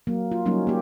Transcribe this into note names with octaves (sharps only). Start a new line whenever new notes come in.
F#3 A#3
F4
F#3 G3 A#3 C#4 D#4
A#3 G4